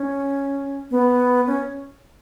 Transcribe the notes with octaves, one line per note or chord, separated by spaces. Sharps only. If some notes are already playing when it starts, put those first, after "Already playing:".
Already playing: C#4
B3
C#4